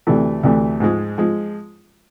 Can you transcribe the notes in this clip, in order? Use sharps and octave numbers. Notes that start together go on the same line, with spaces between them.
D2 C3 E3 A3
D2 C3 E3 A3
G#2 F3 G#3
F3 G#3